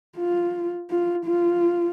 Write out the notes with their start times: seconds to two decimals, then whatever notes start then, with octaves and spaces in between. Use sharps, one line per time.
0.17 F4
0.90 F4
1.26 F4